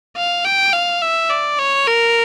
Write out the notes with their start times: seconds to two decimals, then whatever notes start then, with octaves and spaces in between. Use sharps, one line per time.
0.17 F5
0.45 G5
0.73 F5
1.02 E5
1.30 D5
1.59 C#5
1.88 A#4